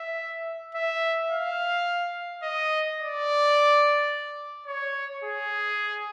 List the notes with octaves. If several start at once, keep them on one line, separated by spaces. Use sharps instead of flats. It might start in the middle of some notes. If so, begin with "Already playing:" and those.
Already playing: E5
E5
F5
D#5
D5
C#5
G#4